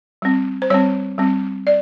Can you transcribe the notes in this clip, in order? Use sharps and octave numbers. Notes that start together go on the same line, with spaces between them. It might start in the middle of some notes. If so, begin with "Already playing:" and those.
G3 C4
C5
G3 C4 C#5
G3 C4
D5